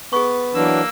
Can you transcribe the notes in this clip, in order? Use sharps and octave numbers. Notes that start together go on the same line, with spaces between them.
B3 G#4 C#6
E3 F#3 A#3 D4 E6